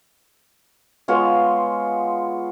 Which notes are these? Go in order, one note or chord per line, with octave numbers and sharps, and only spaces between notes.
G#3 B3 F4 C#5